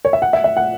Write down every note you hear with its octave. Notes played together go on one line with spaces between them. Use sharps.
C#5
E5
F#5
E5
E5
F#5